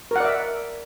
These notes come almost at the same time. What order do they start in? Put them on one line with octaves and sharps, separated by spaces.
A#4 F#5 D5 E5